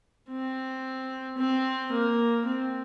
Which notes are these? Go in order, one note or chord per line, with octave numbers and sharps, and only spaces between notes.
C4
C4
A#3
C4